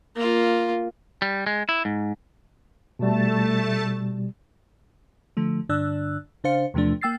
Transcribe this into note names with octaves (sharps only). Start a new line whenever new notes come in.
A#3 F4
G3
G#3
E4
G#2
B2 G3 A3 A5
D3 F3 A3
G2 D3 D4 D5 E6 F#6
C#3 D4 C5 F5 C#7
E2 C3 F3 A3 D4
A#3 G5 E6 A6 C7